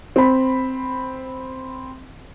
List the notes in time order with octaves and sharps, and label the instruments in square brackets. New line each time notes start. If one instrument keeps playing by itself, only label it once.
[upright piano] C4 B5